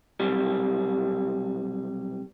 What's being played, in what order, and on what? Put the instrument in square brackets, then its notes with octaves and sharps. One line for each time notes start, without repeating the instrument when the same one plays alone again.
[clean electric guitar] B1 C3 G3